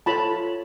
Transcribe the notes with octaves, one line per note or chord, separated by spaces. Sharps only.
F4 A4 C#5 A5 B5